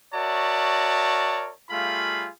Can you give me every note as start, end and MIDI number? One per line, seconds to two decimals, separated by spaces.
0.13 1.51 66
0.13 1.51 70
0.13 1.51 73
0.13 1.51 74
0.13 1.51 76
0.13 1.51 81
1.70 2.28 55
1.70 2.28 57
1.70 2.28 65
1.70 2.28 68
1.70 2.28 77
1.70 2.28 83